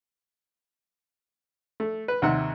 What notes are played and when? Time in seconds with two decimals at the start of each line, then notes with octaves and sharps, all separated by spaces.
1.80 A3
2.08 B4
2.22 D#2 C3 D#3 F#5